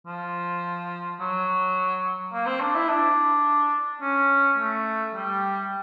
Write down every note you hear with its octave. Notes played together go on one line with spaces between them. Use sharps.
F3
F#3
A#3
C4
D4
E4
D4
C#4
A3
G3